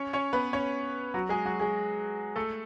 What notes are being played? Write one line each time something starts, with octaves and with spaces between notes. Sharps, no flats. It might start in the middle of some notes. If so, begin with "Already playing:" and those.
Already playing: C#4 C#5
C#4 C#5
B3 B4
C#4 C#5
F#3 F#4
G#3 G#4
F#3 F#4
G#3 G#4
A3 A4